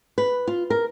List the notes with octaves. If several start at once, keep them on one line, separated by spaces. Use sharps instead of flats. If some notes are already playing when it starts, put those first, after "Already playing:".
B4
F4
A#4